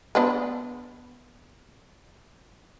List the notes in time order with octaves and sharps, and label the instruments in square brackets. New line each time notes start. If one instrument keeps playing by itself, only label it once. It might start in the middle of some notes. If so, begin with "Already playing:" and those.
[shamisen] B3 D4 B4